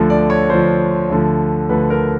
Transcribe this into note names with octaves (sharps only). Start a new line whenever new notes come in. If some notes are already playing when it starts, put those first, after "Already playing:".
Already playing: D2 D3 F3
D5
C#5
D2 D3 F3 C5
D2 D3 F3
D2 D3 F3 B4
A#4